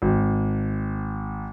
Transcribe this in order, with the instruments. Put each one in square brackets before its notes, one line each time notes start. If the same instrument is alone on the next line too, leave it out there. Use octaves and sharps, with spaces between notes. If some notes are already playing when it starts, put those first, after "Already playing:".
[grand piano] G#1